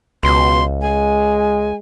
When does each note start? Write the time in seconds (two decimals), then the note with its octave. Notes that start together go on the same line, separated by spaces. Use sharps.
0.23 C#2 B2 C6
0.81 G#3 G#5